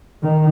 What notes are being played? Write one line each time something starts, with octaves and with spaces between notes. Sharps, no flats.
D#3